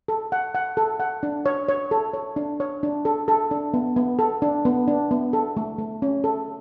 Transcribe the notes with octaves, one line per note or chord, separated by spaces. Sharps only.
A4
F#5
F#5
A4
F#5
D4
C#5
C#5
A4
C#5
D4
C#5
D4
A4
A4
D4
B3
B3
A4
D4
B3
D4
B3
A4
A3
A3
C#4
A4